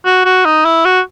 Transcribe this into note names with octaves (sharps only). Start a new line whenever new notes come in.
F#4
F#4
D#4
E4
F#4